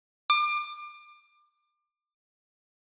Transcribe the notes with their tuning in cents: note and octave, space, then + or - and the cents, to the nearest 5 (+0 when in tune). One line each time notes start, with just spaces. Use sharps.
D6 +30